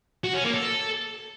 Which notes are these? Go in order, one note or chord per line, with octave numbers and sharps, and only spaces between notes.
F#4
C#4
A#3
A4